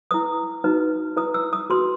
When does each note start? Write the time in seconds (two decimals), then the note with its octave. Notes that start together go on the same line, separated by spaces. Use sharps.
0.11 E4 B4 D#6
0.64 D#4 F#4 B4
1.16 E4 B4 D#6
1.34 E6
1.53 D#6
1.70 F#4 B4 C6